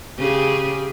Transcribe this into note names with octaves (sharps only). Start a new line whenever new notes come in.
C#3 G4 G#4